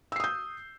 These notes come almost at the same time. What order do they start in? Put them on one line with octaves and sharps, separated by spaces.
E6 C7 D#6 G6